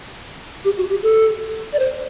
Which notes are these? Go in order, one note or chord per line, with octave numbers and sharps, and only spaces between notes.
G4
F#4
G4
A4
D5
C5